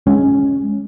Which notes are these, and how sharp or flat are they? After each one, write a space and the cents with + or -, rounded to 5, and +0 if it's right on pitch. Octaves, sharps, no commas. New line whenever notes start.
G#3 +0 C#4 +0